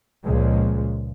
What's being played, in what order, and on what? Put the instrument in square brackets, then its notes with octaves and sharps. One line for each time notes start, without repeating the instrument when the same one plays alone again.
[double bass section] C#2 A#2 F3 G#3